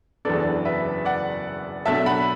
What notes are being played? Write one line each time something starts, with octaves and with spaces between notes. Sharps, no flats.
F#1 E2 E3 B3 D4 A4 D5
B4 E5
D5 F#5
B1 B2 A3 D4 E5 A5
F#5 B5